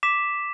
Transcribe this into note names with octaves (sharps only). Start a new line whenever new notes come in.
D6 B6 E7